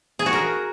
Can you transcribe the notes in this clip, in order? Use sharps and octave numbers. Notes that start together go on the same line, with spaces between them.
G#4
F#4
A#4